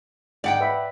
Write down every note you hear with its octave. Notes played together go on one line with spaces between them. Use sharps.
G#2 D5 F#5 G5
B4 E5 B5